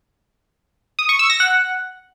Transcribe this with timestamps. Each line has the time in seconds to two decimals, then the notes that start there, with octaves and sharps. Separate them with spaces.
0.99 D#6
1.09 C#6
1.19 E6
1.30 A#6
1.40 F#5